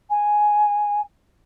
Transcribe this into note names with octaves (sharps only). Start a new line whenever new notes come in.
G#5